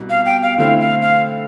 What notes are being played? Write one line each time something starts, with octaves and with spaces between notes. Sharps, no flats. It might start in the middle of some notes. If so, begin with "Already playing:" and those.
Already playing: C2 B2 G3
F5
G5
F5
D3 A3 C4 E4 F5
F5
F5